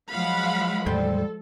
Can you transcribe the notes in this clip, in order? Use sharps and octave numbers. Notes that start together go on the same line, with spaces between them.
F3 F#3 G#3 F5 F#5 B5
E2 A2 D#3 G3 A4 C5